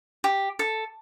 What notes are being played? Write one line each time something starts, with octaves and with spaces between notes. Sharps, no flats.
G4
A4